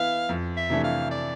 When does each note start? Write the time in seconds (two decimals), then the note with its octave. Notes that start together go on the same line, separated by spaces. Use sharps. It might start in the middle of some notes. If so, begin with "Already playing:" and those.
Already playing: E3 B3 E4 F5
0.29 F2
0.57 E5
0.70 C3 E3 A3 D4
0.84 F5
1.11 D5